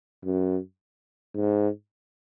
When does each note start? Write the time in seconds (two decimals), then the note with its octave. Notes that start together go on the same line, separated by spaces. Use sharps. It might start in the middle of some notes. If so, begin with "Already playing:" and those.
0.24 F#2
1.35 G#2